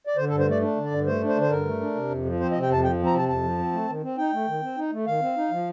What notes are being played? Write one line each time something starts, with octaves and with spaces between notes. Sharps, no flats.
D5
D3 C5
A4
G2
C5
A3 D5
D4
D3
D5
G2
A3 C5
D4
C5
D3
C5
G2 A#4
A3
D4
C3
F2
F3
C4 C5
D#5
C3
G5
F2 A5
F3 G5
C4
A#5
C3 A5
F2 A5
F3
C4
A3
D#3
C4
D#4 G5
A3
D#3
C4
D#4
A3
D#3 F5
C4
D#4
F3